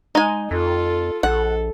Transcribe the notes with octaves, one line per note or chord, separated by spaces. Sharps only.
G#3 D#4 G#5
F2 F4 A4
A#1 A4 F#5